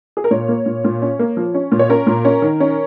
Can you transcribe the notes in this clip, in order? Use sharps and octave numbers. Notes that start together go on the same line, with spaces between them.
G#4
A#4
A#2 C#5
A#3
A#2
A#2
C#4
A#3
F3
C#4
A#2
C#5
C#4 A#4
A#2
C#4
D#3
C#4